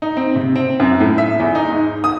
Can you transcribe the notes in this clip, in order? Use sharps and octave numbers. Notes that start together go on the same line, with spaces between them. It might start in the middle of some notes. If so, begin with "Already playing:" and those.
D#4
C4
C3
C4
F#2
A2
E5
E2
D#4
G#2
D#6